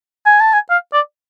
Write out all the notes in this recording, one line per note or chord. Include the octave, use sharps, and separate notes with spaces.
G#5
A5
G#5
F5
D5